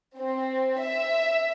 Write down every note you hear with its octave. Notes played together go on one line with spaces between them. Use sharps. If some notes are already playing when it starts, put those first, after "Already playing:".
C4
E5